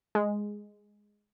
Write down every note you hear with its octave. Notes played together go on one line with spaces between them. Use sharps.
G#3